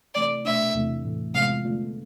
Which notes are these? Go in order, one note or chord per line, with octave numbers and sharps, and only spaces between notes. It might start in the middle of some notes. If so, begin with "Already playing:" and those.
C3 E3 A3 D5
B2 A3 D4 E5
E2 C3 E3 A3
A2 E3 A3
F2 C3 G#3 B3 F4 F5
F2 D3 A3 D4 F4